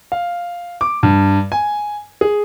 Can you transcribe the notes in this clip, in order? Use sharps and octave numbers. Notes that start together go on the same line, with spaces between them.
F5
D6
G2
G#5
G#4